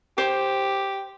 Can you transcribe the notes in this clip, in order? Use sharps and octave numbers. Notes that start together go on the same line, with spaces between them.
G4 C5 D6